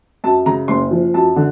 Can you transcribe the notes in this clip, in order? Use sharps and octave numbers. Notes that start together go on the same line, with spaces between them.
F#2 A5
C#3 A#5
F#1 C6
F3
F#2 A5
D3